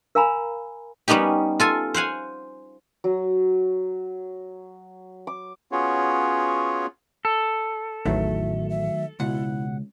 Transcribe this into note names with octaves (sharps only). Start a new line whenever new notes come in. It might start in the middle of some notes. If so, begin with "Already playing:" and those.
A#4 F5 G#5 A#5 B5
G3 B3 C#4 D#4 G4
F4 A4 G#5
C5 F5 F#5 G#5
F#3
D6
B3 C#4 F4 F#4 G#4 C#5
A4
A1 E2 A2 D#3 F#3 A3 E5
E5
C#2 B2 E4 F#5